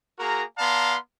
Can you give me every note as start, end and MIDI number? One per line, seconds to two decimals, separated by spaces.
0.19 0.43 58
0.19 0.43 66
0.19 0.43 68
0.19 0.43 70
0.19 0.43 82
0.58 0.95 59
0.58 0.95 74
0.58 0.95 77
0.58 0.95 81
0.58 0.95 82
0.58 0.95 84